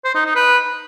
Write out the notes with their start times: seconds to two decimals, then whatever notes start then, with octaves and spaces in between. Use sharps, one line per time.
0.05 C5
0.15 D#4
0.25 D#4
0.35 B4